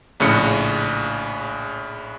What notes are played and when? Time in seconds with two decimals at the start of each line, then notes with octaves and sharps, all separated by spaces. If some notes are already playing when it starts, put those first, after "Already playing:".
0.20 A#1 A2 C#3 C#7